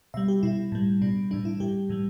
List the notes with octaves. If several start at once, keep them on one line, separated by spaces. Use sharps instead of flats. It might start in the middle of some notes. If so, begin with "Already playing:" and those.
B2 G3 E5
G4
B2 G3 E4
A2 G3
B2 G3 D4
A2 E3 G3 D4
E4
A2 G3 G4
A2 E3 G3